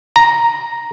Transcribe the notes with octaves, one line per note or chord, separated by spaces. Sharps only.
A#5